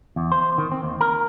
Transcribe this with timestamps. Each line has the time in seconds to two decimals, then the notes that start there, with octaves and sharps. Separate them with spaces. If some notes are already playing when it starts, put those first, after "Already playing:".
0.16 E2
0.32 C5
0.58 D#3
0.72 C4
0.83 D#2
1.01 A#4